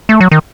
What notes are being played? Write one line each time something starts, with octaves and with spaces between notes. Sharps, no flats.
A3
F#3
D#3